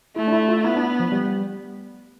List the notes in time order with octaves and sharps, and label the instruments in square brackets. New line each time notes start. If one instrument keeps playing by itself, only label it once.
[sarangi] A3 [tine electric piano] E4
[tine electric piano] D4
E4
F4
[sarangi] B3 [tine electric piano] E4
[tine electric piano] D4
F3
G3